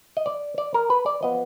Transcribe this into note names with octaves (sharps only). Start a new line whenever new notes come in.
D#5
D5
D5
A#4
B4
D5
F3 B3 D#5